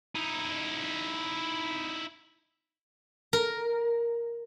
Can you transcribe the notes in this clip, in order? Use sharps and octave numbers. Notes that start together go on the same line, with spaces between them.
D#4 E4
A#4